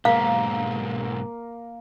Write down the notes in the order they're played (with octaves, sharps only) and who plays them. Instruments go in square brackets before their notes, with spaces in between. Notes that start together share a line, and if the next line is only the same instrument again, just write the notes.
[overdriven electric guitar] B1 G#2 [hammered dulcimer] A#3 [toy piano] F5